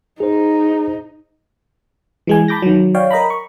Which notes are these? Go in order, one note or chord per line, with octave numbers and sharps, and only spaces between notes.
D#4 G#4 C5
E3 G#3 G#5
A5 B5 D6 G6 A#6
D#3 F#3
C#5 D5 F5 G5
A#4 D#5 A#5 B5
C#6